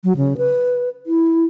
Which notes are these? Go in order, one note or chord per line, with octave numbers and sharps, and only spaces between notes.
F#3
C#3
B4
E4